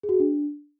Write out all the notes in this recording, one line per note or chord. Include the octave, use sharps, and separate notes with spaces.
G#4
F#4
G#4
D4